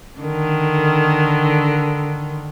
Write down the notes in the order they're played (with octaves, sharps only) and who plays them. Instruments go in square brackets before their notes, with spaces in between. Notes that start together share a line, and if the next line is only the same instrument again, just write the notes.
[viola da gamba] D3 D#3